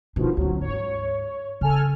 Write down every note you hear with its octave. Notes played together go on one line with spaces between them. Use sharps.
B2 D#3 F3 D4
D2 F#3 C#4
G#2 C#5
C#3 A4 G#5 F6